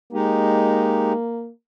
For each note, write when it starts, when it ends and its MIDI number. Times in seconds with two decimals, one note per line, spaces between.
0.13 1.13 56
0.13 1.51 58
0.13 1.13 63
0.13 1.13 67